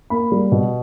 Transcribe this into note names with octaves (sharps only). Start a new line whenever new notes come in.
A#3 B5
G3
B2